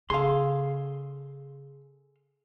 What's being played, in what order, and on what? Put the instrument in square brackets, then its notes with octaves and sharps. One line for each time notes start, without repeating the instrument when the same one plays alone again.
[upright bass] C#3 [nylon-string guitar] G#4 A4 [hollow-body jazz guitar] F5 C6